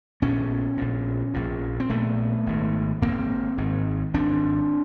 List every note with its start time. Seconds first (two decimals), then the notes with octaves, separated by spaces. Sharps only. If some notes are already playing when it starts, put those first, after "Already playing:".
0.22 A#1 A#2 B3 C#4
0.77 A#1 A#2
1.34 A#1 A#2
1.80 C4
1.90 A#1 A#2 A3 B3
2.46 G#1 G#2
3.02 G#1 G#2 A#3 C4
3.58 G#1 G#2
4.14 G#1 G#2 C4 D4